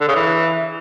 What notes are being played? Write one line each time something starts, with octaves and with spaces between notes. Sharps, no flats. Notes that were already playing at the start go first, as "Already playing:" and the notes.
D3
C#3
E3